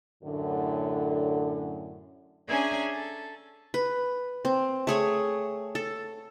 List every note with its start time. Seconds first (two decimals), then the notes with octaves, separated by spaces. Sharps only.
0.24 F#2 A2 D3
2.47 C#4 D4 G#4 E5 G#5 A#5
2.93 A4
3.74 B4
4.45 C4
4.87 A3 G#4 C#5
5.75 A4